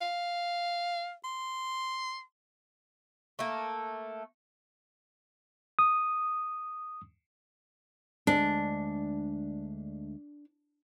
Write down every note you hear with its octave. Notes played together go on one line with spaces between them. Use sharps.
F5
C6
A3 A#3
D#6
D2 G#3 D4